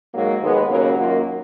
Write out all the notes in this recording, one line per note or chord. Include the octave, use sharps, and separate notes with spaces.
G#2 F#3 A#3
D#2 D#3 G#3 B3
D#2 C#3 F#3 A#3 A#4
F#2 D#3 F#3 A#3 F4